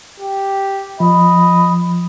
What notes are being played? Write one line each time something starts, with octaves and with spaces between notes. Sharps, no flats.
G4
F3 D#5 B5